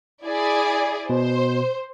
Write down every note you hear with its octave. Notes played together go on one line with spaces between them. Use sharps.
E4 G#4 D5
B2 C5